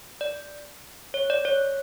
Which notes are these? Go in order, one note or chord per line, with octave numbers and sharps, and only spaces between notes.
D5
C#5
D5
C#5